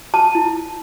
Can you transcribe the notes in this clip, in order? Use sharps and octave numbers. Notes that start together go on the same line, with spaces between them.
A5
E4